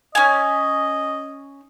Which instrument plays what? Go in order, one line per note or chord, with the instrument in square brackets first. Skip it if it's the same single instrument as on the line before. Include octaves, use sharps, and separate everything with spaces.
[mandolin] C#4 G#5 [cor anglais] D#5